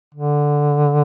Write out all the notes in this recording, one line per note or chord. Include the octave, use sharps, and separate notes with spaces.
D3